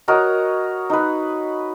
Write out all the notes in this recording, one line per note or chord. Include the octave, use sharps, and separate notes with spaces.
F#4 A#4 C#5 D#5
D#4 B4